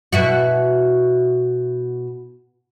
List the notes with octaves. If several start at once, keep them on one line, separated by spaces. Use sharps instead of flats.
B2 E4 F#4